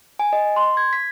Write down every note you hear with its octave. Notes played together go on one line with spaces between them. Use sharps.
G#5
D#5
C6
G#6
B6